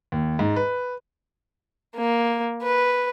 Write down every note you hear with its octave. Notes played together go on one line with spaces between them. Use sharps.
D#2
G#2
B4
A#3
B4